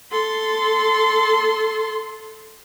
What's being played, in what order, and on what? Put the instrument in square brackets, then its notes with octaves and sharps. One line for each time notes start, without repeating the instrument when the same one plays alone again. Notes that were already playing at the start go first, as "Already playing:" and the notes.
[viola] A4 C6